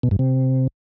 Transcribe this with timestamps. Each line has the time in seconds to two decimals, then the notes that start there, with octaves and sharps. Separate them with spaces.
0.03 B2
0.11 G2
0.19 C3